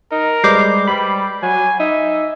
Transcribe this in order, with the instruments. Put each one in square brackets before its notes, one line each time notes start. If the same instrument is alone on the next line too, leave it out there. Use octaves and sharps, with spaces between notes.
[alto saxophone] D#4 [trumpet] A#4
[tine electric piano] G3 G#3 B4 [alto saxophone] C5 [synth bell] D6 G6 C7
[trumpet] G3 [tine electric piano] B5
[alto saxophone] F#3 [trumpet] G#5
[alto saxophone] D#4 [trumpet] E5